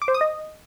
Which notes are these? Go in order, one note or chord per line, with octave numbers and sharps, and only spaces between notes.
D6
C5
D#6
D#5